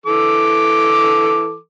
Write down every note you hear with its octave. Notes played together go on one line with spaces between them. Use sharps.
E3 A4 D6